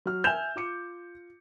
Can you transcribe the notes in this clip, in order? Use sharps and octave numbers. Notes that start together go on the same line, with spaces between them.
F#3 F6
E5 G#5 G6 E7 F7
F4 D6 C#7